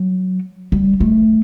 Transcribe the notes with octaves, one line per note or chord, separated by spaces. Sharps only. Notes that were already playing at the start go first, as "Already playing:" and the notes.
Already playing: F#3
G3
A3